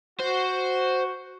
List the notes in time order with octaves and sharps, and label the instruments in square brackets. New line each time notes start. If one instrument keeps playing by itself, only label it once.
[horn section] F#4 [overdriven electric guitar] C5